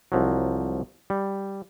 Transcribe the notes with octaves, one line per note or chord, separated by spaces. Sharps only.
C2 F3 F#3
G3